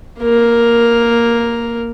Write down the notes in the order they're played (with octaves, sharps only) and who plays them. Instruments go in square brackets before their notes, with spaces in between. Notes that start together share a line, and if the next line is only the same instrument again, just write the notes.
[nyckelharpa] A#3 A#4